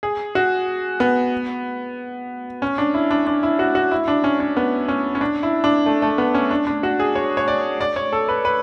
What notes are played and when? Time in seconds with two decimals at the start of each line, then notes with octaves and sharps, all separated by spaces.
0.03 G#4
0.35 F#4
1.00 B3
2.62 C#4
2.78 D4
2.94 E4
3.11 D4
3.27 D4
3.43 E4
3.59 F#4
3.75 F#4
3.91 E4
4.08 D4
4.24 C#4
4.40 C#4
4.57 B3
4.88 C#4
5.15 C#4
5.21 D4
5.43 E4
5.64 D4
5.86 A3
6.02 A3
6.18 B3
6.35 C#4
6.51 D4
6.67 D4
6.83 F#4
7.00 G#4
7.15 C#5
7.37 C#5
7.48 D5
7.81 D5
7.96 C#5
8.13 A4
8.29 B4
8.45 B4